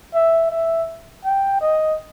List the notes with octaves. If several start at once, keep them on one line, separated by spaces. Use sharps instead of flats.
E5
E5
G5
D#5